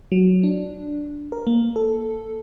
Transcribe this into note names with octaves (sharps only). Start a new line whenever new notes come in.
F#3
D4
A#4
A#3
A4